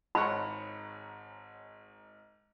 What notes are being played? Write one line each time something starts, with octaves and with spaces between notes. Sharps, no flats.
G#1 G#2 C#5 F#5 B5 C6